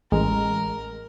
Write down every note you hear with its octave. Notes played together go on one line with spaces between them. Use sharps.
A1 G#3 A#4